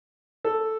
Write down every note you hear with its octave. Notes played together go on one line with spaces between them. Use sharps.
A4